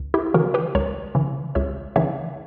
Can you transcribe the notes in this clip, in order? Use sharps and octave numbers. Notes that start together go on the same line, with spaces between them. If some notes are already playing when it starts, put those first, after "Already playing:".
Already playing: C#2
E4 G4
C#3 E3 F#4 A#4
G4 B4
C#2 A#4 C#5
C#3 E3
C#2 C#5 E5
C#3 E3 C#5 E5